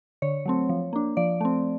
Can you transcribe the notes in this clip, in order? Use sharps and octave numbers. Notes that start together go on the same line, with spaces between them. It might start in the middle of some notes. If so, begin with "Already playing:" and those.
D3 C#5
F#3 A3 C4
F3
A#3 D4
F3 D5
A3 C4